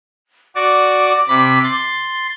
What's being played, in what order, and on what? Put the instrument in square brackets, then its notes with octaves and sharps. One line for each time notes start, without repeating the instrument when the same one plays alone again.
[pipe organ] F#4 D5 [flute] D6
[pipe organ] C3 B5
C6 A6